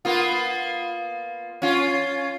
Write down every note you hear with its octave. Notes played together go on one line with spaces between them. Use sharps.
A#3 B3 F4
C#4 F4